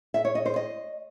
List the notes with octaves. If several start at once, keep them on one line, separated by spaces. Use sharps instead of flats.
E5
C#5
D#5
C5
D#5